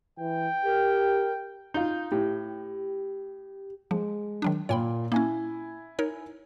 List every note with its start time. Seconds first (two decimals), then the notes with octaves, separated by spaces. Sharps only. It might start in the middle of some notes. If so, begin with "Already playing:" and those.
0.19 E3 G5
0.65 G4 A#4
1.74 D#4 F4 G6
2.12 A2 G4
3.91 F3 G#3
4.42 D#3 F#3 D4
4.69 A#2 A#3 C#5 G5 B5
5.12 A#3 C#4 E4 G#5
5.99 D#4 A#4 C#5